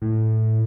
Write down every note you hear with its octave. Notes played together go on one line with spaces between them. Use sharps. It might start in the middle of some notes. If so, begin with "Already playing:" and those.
A2